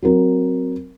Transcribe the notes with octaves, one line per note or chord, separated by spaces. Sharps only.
F#3 C4 A#4